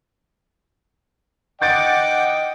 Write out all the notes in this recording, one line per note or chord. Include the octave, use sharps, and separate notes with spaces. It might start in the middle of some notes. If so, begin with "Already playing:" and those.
D#5 F#5 G5 D6 G6 A6 D7